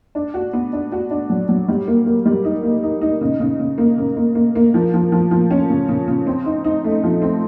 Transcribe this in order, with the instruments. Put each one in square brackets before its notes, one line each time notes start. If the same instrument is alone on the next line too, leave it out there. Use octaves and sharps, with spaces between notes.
[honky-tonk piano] D4
F#4
B3
D4
F#4
D4
F#3
F#3
G3
A#3
A#3
G3
D#4
A#3
D#4
D#4
C#3
C#3
C#3
A#3
C#3
A#3
A#3
A#3
F3
F3
F3
F3
C#4
C#3
C#3
C#3
C4
D#4
D#4
A3
F3
C4